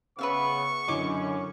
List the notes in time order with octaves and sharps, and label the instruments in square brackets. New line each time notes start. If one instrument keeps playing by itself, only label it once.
[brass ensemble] C#3 B3 [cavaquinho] B4 E5 F5 [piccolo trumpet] C#6
[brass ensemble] F#2 C#4 [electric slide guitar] D3 E4 D#5 [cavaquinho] D6